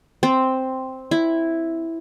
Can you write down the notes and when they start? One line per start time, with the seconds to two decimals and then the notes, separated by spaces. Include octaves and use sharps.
0.23 C4
1.11 E4